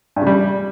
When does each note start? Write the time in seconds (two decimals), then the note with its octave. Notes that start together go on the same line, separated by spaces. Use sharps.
0.16 G2
0.22 C#3
0.27 G3